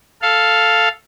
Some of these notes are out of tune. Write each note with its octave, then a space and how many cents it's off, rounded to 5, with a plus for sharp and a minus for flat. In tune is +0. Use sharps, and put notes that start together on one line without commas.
A4 +0 F5 +0